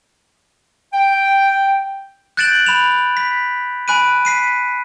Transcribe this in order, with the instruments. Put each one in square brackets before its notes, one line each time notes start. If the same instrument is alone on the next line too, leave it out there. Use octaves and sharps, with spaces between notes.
[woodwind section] G5
[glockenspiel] F#6 G6 A6 D7 E7 F#7
B5 E7 F7
B6
G#5 B5 F#6 D7 D#7
B6 C7 D#7